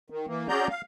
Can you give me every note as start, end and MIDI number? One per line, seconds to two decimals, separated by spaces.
0.10 0.26 51
0.27 0.47 52
0.27 0.47 58
0.48 0.68 61
0.48 0.68 66
0.48 0.68 68
0.48 0.68 74
0.48 0.68 82
0.48 0.68 91
0.70 0.81 77